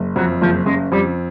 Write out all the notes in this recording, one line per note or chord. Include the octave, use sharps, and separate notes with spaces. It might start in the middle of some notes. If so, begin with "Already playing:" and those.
Already playing: F#1
F2 F#3
F#1 F3
C#3 G#3
F2 G3